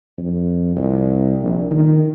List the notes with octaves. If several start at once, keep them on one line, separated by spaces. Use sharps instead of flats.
F2
C2
A#1
D#3